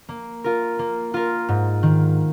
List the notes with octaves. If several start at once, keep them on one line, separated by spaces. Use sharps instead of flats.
A#3
F4 A#4
A#3
F4 A#4
G#2
D#3